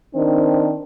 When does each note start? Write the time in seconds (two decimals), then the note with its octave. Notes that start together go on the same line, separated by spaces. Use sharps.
0.14 D#3 C4 D4